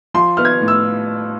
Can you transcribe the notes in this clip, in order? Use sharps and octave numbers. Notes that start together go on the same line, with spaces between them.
F3 C6
B3 F6
G#6
A2
E6